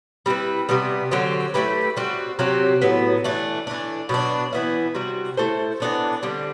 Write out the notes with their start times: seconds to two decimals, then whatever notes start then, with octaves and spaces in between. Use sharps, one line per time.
0.26 G3 C4 E4 B4
0.69 C3 G3 B3
1.11 D3 F#3 C4 G4
1.54 A3 E4 G4 B4
1.97 G3 C4 F#4
2.39 C3 F#3 C4 G4
2.81 A2 F#3 B3
3.24 E3 A3 D4
3.67 E3 A3 D4
4.09 B2 F#3 B3 D4
4.53 E3 B3 E4
4.95 C3 G3 C4 F#4
5.37 A3 E4 A4 C5
5.80 E3 B3 D4 A4
6.23 D3 G3 C4